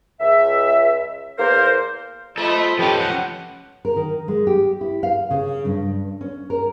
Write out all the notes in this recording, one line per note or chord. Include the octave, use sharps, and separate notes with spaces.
C#2 E5
E2 A#3 A#4 C5
F3 A4 D#5 E5 B5
F3 C#4 G4 A4 B4
F#5
A#4
D#3
G#3
G4
E4
F5
C#3
G2
C#4
A#4